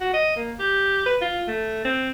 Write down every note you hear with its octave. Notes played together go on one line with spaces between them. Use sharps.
F#4
D#5
A#3
G4
B4
F4
A3
C4